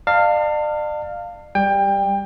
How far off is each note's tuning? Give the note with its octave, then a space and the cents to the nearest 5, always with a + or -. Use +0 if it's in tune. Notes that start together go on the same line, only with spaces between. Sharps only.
D5 +40 F5 +0 A5 +35
G3 +5 G5 +25